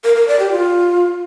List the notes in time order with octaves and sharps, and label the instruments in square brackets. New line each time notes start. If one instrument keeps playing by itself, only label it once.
[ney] A#4
A#4
D5
G4
F4